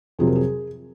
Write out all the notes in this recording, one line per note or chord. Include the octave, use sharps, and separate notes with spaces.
F2 C3 F#3 G#4
A#4
G#4